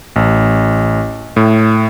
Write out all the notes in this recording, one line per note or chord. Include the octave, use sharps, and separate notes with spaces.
A1
A2